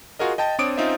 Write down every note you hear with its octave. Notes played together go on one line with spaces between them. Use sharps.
F4 F#4 G#4 A#4 D#5
D#5 G5 A5 A6
C4 D4 C#5 D6 D#6 D7
C4 C#4 D#4 F4 C5 E5